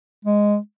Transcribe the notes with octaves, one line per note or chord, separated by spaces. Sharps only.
G#3